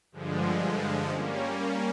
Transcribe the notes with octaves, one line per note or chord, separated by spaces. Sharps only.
G2 D3 F3 G#3
G3 A#3 C#4